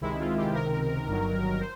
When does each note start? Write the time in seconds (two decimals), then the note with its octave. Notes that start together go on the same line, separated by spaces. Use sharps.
0.01 C#2 C3 D#3 G#3 E4
0.20 F4
0.38 G4
0.54 C#2 C3 D#3 A#4
1.08 G1 G2 D#3 F#3
1.60 C5